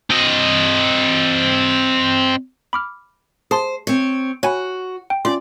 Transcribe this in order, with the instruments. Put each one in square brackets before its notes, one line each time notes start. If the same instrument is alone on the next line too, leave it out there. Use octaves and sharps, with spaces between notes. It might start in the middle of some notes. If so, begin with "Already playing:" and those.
[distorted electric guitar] C4 D#5
[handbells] B5 D6 F6
[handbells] G#4 A5 C6 [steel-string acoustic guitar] C5
[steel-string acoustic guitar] C4 C#5
[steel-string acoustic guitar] F#4 [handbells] C#5 G#5 B5
[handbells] G5
[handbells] C#4 F4 C6 [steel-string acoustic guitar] D5